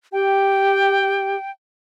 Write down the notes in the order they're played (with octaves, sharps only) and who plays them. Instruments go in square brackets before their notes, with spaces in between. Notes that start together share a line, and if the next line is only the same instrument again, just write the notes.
[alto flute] G4 [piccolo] G5